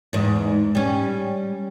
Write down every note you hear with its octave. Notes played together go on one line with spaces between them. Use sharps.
E2 G#2
G3 C#4